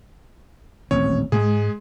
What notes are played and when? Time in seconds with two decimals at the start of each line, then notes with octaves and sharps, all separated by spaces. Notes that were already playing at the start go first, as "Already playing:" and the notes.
0.91 D#1 A1 C4 C#5
1.32 G#2 G#3 G#4